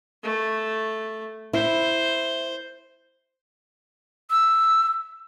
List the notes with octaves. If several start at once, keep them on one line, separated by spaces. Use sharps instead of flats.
A3
E4 C5
E6